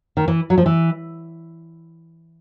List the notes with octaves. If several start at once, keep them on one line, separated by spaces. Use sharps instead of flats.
D#3
E3
F#3
F3
E3